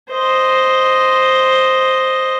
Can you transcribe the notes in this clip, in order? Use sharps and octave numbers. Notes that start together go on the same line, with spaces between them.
C5 D#5